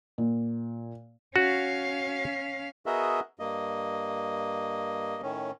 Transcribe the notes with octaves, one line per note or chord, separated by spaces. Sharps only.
A#2
C#4 F#4 F5
B3 F#4 G#4 A#4 D#5 E5
G2 A#3 D#5
A2 D#3 C#4